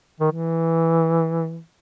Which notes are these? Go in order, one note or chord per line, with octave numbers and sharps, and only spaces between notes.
D#3
E3